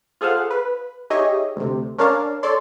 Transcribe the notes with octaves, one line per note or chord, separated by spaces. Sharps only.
F4 G#4 A4 C5 F5 F#5
B4
D#4 G4 G#4 C#5 D#5 E5
D2 C3
C#4 D4 A#4 C#5 F5 A5
A4 C#5 D5 C6